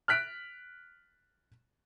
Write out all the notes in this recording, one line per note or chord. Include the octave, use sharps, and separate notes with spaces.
F6 F#6 B6 D7